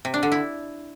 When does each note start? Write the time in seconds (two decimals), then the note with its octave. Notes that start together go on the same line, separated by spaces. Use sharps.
0.05 C3
0.14 D4
0.23 D3
0.32 E4